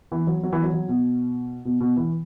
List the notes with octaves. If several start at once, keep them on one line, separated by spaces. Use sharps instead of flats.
E3
F#3
F#3
E3
F#3
F#3
B2
B2
B2
E3